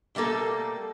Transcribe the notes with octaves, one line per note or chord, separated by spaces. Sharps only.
B2 G3 A3 A#3 A4